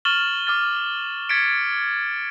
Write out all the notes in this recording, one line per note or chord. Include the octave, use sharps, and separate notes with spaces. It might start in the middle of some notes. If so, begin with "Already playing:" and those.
C#6 F6 A6 E7 F#7 G7
D6 F6 A6
G#6 A6 B6 C#7 D7